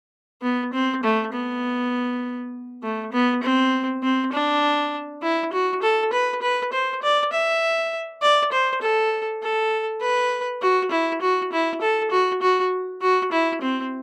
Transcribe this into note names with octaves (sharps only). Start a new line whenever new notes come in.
B3
C4
A3
B3
A3
B3
C4
C4
D4
E4
F#4
A4
B4
B4
C5
D5
E5
D5
C5
A4
A4
B4
F#4
E4
F#4
E4
A4
F#4
F#4
F#4
E4
C4